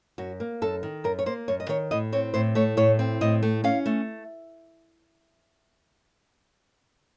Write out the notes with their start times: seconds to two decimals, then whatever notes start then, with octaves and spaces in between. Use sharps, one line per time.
0.18 F#2 F#4
0.40 A#3
0.62 F#2 A4
0.83 D#3
1.04 F#2 A#4
1.19 C#5
1.26 A#3 C5
1.48 F#2 C#5
1.60 D#5
1.69 D#3 C#5
1.91 A2 D#5
2.13 C4 C#5
2.34 A2 C5
2.55 A3 C#5
2.77 A2 C#5
2.99 C4
3.21 A2 D#5
3.43 A3
3.64 C#4 F5
3.86 A3